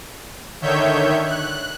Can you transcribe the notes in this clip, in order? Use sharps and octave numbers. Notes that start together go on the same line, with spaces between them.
D3 D#3 C#5 E5 G6
F#6